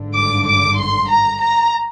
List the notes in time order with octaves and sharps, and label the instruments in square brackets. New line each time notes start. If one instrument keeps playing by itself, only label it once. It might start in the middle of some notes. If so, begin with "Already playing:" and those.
Already playing: [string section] G#1 G2 D3
D6
D6
C6
A#5
A#5